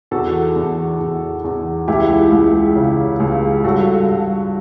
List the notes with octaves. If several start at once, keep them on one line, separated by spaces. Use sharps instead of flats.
E2 F#4 A4
E2
E2
E2
C#2 E4 G4
C#2
C#3
C#2
G2 F#4 A4
G2